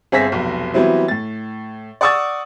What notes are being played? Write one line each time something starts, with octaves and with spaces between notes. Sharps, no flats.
G1 C4 G#4 E5 A#6 B6
F1 B1
E3 F#3 G3 B3 C4 E4
A2 A6
D5 F#5 C#6 D#6 E6 A6